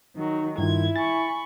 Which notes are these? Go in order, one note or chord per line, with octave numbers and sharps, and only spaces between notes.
D#3 F#3 D#4
G2 D#3 E4 F4 G#6
G#5 B5 C#6 A6